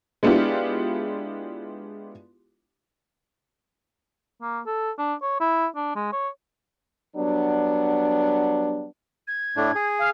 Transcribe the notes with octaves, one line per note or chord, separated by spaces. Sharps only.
G#3 B3 D4 E4 F4 G4
A#3
A4
D4
C#5
E4
D4
G#3
C#5
F#3 G3 B3 D4
G#6
A2 A3 D4
G#4
F5